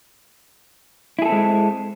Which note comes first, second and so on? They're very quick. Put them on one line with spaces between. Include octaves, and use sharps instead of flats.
E4 G#4 A4 C4 G#3